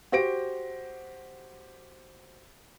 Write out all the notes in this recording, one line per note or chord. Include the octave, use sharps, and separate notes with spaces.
F#4 G4 C5 A#6 D7